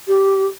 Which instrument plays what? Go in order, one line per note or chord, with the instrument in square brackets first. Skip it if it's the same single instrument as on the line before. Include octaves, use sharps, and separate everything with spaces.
[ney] G4